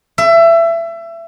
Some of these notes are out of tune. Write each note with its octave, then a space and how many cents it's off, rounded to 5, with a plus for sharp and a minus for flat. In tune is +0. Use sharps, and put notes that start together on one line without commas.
E5 +25